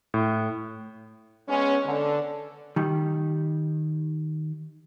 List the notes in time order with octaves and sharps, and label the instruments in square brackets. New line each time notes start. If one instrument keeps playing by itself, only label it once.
[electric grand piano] A2
[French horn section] G#3 B3 C#4
D3
[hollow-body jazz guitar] D#3 G3